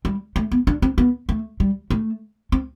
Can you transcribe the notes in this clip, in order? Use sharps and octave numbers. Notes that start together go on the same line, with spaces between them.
G3
A3
B3
D4
C4
B3
A3
G3
A3
C4